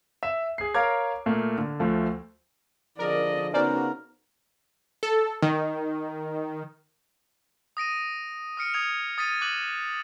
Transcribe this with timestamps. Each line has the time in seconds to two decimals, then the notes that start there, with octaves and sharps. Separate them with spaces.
0.23 E5 E7
0.58 G#4 C7
0.74 A#4 C#5 F5 A#5 D6 G#6
1.26 A#2 A3 A#3
1.58 D3
1.80 D2 F3 A3
2.99 D3 F3 G#4 A#4 D5 D#5
3.54 C#3 B3 C#4 D#4 F#4 A#4 C5 D5
5.03 A4
5.42 D#3
7.77 D#6 A#6 D7 D#7
8.57 D#6 F6 C#7 D7
8.74 D#6 G#6 D7 F7
9.18 D#6 A6 B6 D#7
9.41 D6 F#6 D#7 F#7